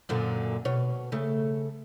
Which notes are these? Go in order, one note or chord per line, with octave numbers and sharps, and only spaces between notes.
F#2 A#2 D3
B2 C#5
C#3 A3